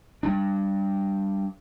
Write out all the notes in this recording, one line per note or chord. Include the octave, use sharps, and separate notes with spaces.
G3 D4